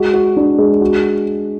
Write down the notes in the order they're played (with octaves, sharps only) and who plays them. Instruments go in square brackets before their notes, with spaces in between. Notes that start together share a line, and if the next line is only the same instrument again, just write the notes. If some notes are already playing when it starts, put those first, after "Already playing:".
Already playing: [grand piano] G#3 F#4
F#4
D4
G#3
F#4